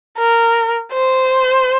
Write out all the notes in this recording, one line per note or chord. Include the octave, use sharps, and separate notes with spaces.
A#4
C5